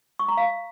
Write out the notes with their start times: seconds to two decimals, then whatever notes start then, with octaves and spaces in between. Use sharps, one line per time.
0.19 C#6
0.28 A#5
0.37 F5